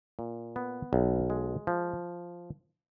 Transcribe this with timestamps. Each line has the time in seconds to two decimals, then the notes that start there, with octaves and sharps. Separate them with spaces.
0.19 A#2
0.56 B3
0.93 B1
1.30 G#3
1.67 F3